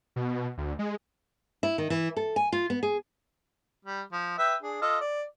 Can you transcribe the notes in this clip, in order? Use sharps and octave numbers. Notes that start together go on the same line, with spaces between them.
B2
D2
G#3
E4
D#3
E3
A4
G#5
F4
B3
G#4
G3
F3
B4 E5 G5
D4 G#4
F4 A4 D#5
D5